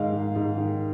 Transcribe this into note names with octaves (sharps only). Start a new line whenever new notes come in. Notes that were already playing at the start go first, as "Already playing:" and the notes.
Already playing: G#2 D#3 G#3 F5
G#2
G#2
D#3